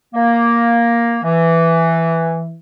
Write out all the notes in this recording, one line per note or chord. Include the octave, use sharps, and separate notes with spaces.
A#3
E3